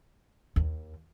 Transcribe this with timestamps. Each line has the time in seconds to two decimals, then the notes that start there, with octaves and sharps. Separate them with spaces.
0.56 D#2